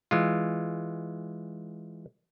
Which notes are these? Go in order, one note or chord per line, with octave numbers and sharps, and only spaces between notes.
E3 G#3 F4